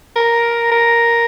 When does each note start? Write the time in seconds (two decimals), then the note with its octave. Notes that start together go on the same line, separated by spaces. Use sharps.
0.16 A#4
0.71 A#4